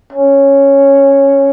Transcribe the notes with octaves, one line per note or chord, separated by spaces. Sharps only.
C#4